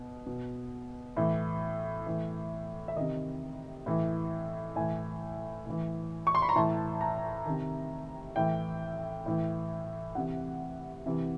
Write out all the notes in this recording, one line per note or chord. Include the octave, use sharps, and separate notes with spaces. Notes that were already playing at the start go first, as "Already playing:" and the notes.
Already playing: B2
B2
A2 E3
A2 E3
E5
C3 D#3 D#5
A2 E3
A2 E3 G#5
A2 E3
C#6
C6
B5
A#5
A2 E3 A5
A#5
C3 D#3
A2 E3 G5
A2 E3
C3 E3 F#5
C3 E3